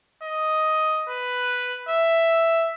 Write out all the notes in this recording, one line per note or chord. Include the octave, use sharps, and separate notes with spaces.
D#5
B4
E5